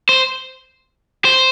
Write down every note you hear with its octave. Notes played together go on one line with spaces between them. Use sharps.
C5
C5